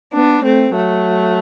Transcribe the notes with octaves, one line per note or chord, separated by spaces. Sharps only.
B3 D4
A3 C4
F#3 A3